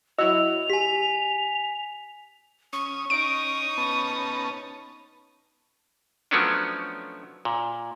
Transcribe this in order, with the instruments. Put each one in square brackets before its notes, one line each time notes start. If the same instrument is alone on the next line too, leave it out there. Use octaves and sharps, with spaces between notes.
[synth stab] F#3 E4 F#4 [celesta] D#5 E6 [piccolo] F7
[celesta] G4 [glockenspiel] G#5 B6
[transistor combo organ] C#4 D#6 [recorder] C#6
[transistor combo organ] C#4 [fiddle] D#4 D#6 [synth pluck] D7
[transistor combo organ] B3 C#4 A5
[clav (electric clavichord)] F3 F#3 A3 B3 C#4 D4
A#2